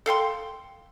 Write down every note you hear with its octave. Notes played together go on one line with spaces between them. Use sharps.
A4 F5 G5 C6